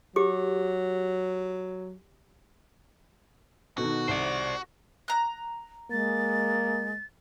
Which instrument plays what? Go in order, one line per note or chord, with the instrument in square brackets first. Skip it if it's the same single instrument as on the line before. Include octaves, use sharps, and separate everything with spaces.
[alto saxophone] F#3 [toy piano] G4 D6
[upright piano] B2 [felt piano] D#3 D#4 A4 [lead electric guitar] F#4
[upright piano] C2 [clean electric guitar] C5 D5
[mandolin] A#5 F#6
[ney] G#3 [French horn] A#3 [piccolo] A6